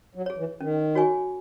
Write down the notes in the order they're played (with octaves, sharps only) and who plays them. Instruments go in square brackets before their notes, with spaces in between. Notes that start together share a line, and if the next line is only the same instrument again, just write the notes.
[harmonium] F#3
[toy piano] G#4 C#5
[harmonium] E3
[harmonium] D#3 [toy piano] C#4
[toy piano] F#4 C#5 G#5 C#6